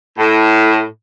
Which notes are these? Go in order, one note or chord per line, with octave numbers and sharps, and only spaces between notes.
A2